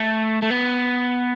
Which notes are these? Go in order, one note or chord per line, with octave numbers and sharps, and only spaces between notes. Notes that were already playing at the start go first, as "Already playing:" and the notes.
Already playing: A3
A3
B3